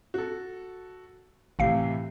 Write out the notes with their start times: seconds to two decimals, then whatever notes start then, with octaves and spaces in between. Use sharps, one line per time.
0.14 F#4 A4
1.59 G#1 A2 C3 E3 F5 C7